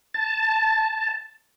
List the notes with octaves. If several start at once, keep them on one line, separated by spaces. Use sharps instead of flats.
A5